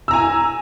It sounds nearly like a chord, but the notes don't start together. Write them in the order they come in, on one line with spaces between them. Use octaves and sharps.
E6 A#5 G#5